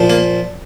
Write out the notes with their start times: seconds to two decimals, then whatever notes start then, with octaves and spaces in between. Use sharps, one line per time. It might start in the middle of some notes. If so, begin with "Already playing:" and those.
Already playing: A#2 F3
0.10 A#3